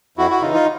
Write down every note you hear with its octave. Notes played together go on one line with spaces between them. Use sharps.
F2 E4 F#4
F#4
C#3 E3 D#4 F4
F4